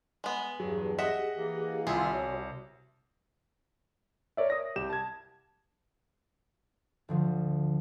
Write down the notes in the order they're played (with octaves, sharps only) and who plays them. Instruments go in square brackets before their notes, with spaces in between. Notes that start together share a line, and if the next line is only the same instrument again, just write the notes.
[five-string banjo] G#3 B3
[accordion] E2 G2 [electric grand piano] F#3 [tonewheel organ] G4 G#4
[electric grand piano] D#5 F#5 A#6 [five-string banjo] E5
[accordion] E3 A#3
[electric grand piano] C2 [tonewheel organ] D#3 E4 [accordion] G3 F4 E5 [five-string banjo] G#4
[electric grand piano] C2 [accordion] C3 [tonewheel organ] F#4 C#5
[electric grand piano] A#4 C#5 D5 E5
D#6 A#6
C2 G4 E7
A5 G#6
[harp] D2 D3 F3